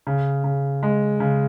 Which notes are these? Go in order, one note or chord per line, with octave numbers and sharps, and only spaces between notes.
C#3
C#3
G#3
C#3